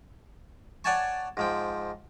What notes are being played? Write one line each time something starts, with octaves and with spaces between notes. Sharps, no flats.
C#5 D5 F#5 G#5 A5 C#6
G#2 F3 G5